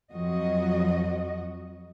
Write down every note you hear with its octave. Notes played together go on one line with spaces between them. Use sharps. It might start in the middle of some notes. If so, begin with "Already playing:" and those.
F2 F3 F#3 F#4 D#5